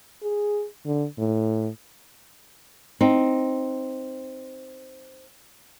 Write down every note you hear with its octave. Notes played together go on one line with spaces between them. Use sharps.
G#4
D3
A2
C4 D#4